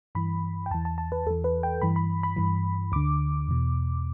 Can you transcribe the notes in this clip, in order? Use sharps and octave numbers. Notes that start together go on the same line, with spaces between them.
G2 E3 B5
G5
E2 E3 A5
A5
A5
B4
E2 E3 A4
B4
G5
G2 E3 B5
B5
B5
G2 E3
D2 D3 D6
E2 B2